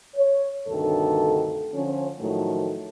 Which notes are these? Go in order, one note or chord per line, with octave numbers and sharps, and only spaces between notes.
C#5
D2 G2 C3 D#3 A4
D3 F3 C#4
A2 D#3 F3 F#3 A3